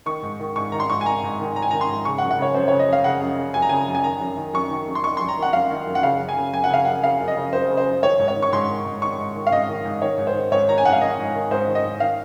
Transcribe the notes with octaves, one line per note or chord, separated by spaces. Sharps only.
D#3 C#6
G#2
D#3
G#2 C#6
D#3 A#5
C6
G#2 C#6
G#5
D#3 A#5
G#2
D#3
G#2 A#5
G#5
D#3 A#5
C6
G#2
C#3 C#6
F#5
F#2
F#5
C#3 C#5
F#2 C5
C#3 C#5
D#5
F#2 F5
C#3 F#5
F#2
C#3
F#2 G#5
A#5
C#3 G#5
F#2
G#5
D#3 A#5
F#2
D#3
F#2 C#6
D#3
F#2
C6
D#3 C#6
F#2 C6
A#5
D#3
F#5
F#2 F5
D#3
F#2
F#5
C#3 F5
F#2
G#5
C#3
F#2 G#5
F#5
C#3 F5
F#2 F#5
C#3 F5
F#2
D#5
C#3
F#2 C5
C#3
C5
F#2
D#3 C#5
G#2
C#5
D#3
C#6
G#2 C6
D#3
G#2
D#3 C#6
G#2
D#3
F5
G#2 D#5
D#3
G#2
D#3 C#5
G#2
C5
D#3
G#2 C#5
D#3 A#5
G#5
G#2 F#5
F5
D#3 D#5
G#2
D#3
G#2 C5
D#3
D#5
G#2
D#3 F5